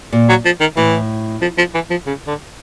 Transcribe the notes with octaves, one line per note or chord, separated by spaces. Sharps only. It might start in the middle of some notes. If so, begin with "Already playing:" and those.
A#2
F#3
F3
D#3
A2 E3
F3
F3
E3
F3
C#3
D3